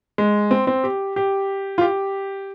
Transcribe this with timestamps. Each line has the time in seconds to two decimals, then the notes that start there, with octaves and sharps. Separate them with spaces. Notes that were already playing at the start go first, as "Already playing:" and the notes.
0.18 G#3
0.51 C4
0.67 C4
0.84 G4
1.16 G4
1.78 F4
1.81 G4